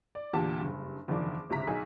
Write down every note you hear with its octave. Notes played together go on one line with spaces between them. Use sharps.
D5
E2 A#2 D3 G4 A5
F#1 G2
F#1 E2 D#3 F3 D4 D6
G1 C#2 C3 E5 A#5 B6
B1 D#4 G#4